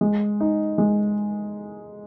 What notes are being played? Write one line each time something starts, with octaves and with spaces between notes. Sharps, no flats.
G#3
D#4
G#3